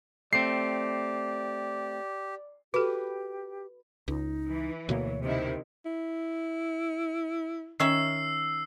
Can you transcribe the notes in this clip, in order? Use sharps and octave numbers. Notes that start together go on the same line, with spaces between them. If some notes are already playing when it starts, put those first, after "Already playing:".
A3 C4 G4 D5 C7
F#4 G4 A4 B4
C#2 D#4
E3
D2 B2 A#3 C#5
C3 D#3 E4 C5
E4
D#3 C#4 E5 E6 C7